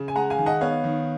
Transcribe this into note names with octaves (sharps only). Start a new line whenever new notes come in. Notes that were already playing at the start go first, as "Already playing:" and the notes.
Already playing: C#3
G#5
G#3 F#5 A#5
F5 G#5
D#3
D#5 F#5
B3 C#5 F5
D#3